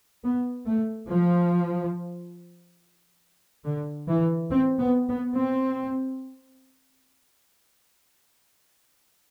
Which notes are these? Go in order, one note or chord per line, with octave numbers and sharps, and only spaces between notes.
B3
A3
F3
D3
E3
C4
B3
B3
C4